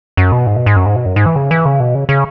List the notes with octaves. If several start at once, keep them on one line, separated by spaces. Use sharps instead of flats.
F#2
B2
G#2
B2
G#2
F#2
G#2
B2
F#2
G#2
E3
C#3
E3
C#3
B2
C#3
C#3